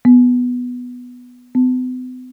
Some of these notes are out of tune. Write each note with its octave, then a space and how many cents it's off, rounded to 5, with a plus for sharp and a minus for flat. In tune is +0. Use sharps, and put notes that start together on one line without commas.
B3 +0
B3 +45